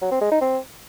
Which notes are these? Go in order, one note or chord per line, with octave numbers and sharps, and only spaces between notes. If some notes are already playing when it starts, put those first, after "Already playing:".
F#3
C4
G#3
D#4
C4